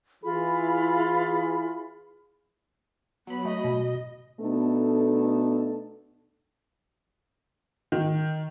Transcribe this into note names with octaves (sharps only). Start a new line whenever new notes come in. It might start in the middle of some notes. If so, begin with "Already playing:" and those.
E3 E4 F4 G#4 B5
F#3 B3 B5
A3 D#5
B2
B2 A3 B3 D4 D#4 A4
D#3